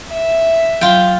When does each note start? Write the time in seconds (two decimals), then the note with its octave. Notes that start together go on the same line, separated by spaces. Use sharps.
0.11 E5
0.81 F#3 F4 G5